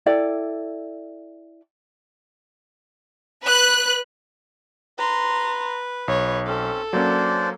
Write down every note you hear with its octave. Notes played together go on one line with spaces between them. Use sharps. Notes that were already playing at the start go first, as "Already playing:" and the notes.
E4 A4 D5 G5
B4 F#6
B4 A#5 C6
B1 C#5
C4 C#4 A4
F#3 A#3 C#4 D4 C5 D5